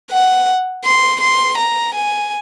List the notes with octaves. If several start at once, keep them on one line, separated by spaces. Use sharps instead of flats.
F#5
C6
C6
A#5
G#5